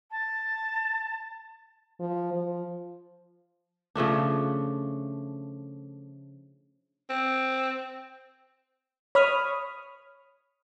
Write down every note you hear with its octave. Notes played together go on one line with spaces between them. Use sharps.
A5
F3
F3
C#3 F3 A3 D4
C4
C#5 B5 D#6 F6